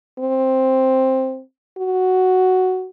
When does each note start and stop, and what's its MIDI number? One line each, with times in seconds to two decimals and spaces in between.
0.19 1.41 60
1.78 2.88 66